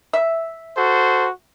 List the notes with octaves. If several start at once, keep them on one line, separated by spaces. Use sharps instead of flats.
E5
F#4 A4 C5